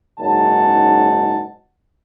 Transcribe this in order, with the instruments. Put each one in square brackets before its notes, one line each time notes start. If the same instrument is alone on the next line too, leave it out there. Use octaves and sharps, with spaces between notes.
[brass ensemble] F#1 G#2 C#4 D#4 F#5 A5